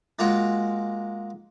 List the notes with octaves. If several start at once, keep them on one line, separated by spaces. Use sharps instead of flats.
G#3 A#3 F4 F#4